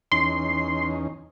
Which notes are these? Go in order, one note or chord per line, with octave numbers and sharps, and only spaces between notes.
E2 C#4 D#4 C6 C7